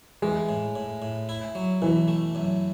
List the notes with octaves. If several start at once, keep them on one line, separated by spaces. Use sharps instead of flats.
E3 G#3
A2
A2
A2
E4
F#3
B2 E3
A3
F#2